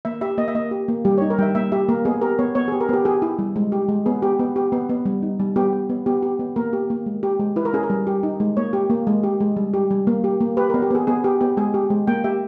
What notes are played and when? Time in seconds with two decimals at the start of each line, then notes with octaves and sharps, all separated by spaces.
0.05 A#3 E5
0.21 G4 E5
0.38 A#3 D#5
0.48 E5
0.55 A#3 D#5
0.71 G4
0.88 A#3
1.05 G3 G4
1.18 D#4 C#5
1.30 A#4
1.38 G3 E5 G5
1.55 A#3 E5
1.72 G4 E5
1.89 A#3 A#4
2.05 B3 G#4
2.22 G4 A#4
2.39 B3 C#5
2.55 B3 C#5
2.68 G4 G#4
2.81 A#4
2.89 B3 G4
3.05 G4 G#4
3.22 E4
3.39 G3
3.56 G#3
3.72 G4
3.89 G#3
4.06 B3 G#4
4.22 G4
4.39 B3
4.56 G4
4.72 B3
4.89 B3
5.05 G3
5.23 D#4
5.40 G3
5.56 B3 G4
5.73 G4
5.90 B3
6.06 B3 G4
6.22 G4
6.39 B3
6.56 A#3 A#4
6.73 G4
6.90 A#3
7.06 G#3
7.23 G4
7.40 G#3
7.56 E4 B4
7.65 A#4
7.73 C#4 G#4
7.83 A#4
7.90 G3
8.07 G4
8.23 D#4
8.40 G#3
8.57 A#3 C#5
8.73 G4
8.90 A#3
9.07 G#3
9.23 G4
9.40 G#3
9.57 G3
9.74 G4
9.91 G3
10.07 A#3
10.24 G4
10.41 A#3
10.57 G4 B4
10.70 B3 A#4
10.82 G4
10.91 B3 G#4
11.07 B3 G#4
11.24 G4
11.41 B3 G4
11.57 G#3 G#4
11.74 G4
11.90 G#3
12.07 A#3 G5
12.24 G4 E5